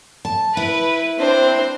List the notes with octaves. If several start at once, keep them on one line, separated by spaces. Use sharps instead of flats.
A5
E4 B4
C4 D4 C5